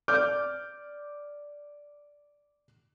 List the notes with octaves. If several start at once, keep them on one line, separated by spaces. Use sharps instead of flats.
D5 D6 F6 G6